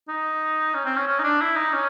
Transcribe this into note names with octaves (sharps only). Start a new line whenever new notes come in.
D#4
C#4
C4
C#4
C#4
D#4
D4
E4
D#4
C#4